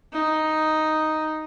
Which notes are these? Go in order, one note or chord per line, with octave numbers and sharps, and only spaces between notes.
D#4